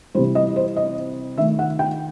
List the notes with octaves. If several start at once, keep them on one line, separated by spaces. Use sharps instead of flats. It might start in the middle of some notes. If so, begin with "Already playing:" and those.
C3 E3 G3 C5
D#5
C5
D#5
D#3 A3 E5
F#5
G5